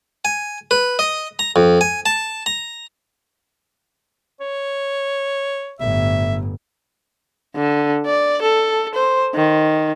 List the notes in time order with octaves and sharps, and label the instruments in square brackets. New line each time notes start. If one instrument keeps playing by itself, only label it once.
[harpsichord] G#5
B4
D#5
A#5
F2
G#5
A5
A#5
[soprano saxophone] C#5
[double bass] G1 A2 [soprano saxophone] E5
[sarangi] D3
D5
A4
C5
D#3